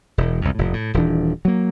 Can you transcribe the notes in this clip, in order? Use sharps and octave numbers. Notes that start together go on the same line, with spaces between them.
E1
C2 F2
F1 A2
A2
D#1 E3 D4
F#3 A#3